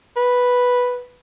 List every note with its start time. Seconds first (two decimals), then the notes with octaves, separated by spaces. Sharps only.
0.16 B4